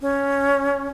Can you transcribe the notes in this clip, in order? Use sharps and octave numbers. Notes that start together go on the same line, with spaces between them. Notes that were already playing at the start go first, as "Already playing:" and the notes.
C#4